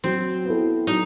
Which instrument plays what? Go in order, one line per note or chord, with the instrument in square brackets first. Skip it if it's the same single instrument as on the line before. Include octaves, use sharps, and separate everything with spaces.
[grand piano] F#3 [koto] C4
[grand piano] B3 E4 A4
[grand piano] F#3 [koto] D#4